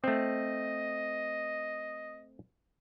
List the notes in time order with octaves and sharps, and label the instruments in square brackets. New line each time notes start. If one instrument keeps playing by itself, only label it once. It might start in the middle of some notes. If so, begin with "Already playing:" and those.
[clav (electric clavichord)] A3 C4 [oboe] D#5